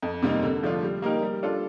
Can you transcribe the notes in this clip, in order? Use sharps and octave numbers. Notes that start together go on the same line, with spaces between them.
F2
C3 G3 A#3 D#4
D3
F3 A3 D4 F4
G3
A#3 D#4 G4 A#4
G3
D4 F4 A4